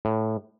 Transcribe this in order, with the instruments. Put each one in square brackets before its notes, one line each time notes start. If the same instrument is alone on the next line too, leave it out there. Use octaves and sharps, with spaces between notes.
[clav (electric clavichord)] A2